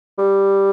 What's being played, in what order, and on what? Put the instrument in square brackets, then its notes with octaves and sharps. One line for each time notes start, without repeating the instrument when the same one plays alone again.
[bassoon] G3